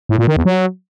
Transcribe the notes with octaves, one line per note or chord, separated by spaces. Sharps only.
A2
A#2
D#3
E2
F#3